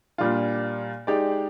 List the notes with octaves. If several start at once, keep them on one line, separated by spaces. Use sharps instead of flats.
A#2 G3 D4 F4
G#3 D#4 G4 D5